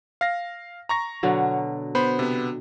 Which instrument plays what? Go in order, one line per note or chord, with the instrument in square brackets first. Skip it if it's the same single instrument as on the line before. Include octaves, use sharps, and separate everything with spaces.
[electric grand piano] F5 A#6
A#5 C#6 A#6
[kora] B2 D3 F#3
[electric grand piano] B3 C5 B5
C3 B3